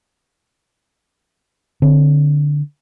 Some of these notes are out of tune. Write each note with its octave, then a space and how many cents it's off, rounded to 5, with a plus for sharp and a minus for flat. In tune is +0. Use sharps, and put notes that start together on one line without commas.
D3 +0 C4 +10